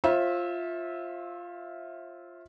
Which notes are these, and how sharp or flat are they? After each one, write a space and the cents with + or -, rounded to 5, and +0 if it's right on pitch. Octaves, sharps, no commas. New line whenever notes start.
F4 +0 C5 +40 E5 -15